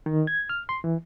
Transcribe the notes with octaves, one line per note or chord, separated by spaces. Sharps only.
D#3
G#6
F6
C6
E3